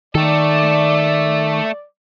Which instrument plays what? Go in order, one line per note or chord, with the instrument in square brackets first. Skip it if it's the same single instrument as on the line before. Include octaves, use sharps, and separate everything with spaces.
[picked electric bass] D#3 [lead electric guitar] A3 A4 [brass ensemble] D5